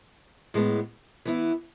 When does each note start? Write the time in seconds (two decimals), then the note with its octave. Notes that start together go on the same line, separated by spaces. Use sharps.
0.54 A2 G#3 B3
1.25 E3 B3 E4